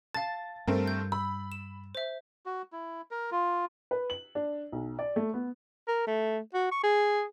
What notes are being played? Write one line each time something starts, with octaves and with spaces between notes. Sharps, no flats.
F5 A5 A6
G2 A3 C4 A#4
G6
B5 E6
E7
C5 E5
F#4
E4
A#4
F4
B4
F#7
D4
B1
D5
A3
B3
A#4
A3
F#4
C#6
G#4